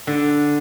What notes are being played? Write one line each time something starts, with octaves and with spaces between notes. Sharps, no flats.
D3